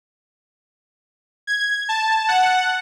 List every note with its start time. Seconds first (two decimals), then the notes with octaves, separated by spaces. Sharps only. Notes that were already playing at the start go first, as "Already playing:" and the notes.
1.47 G#6
1.89 A5
2.28 F#5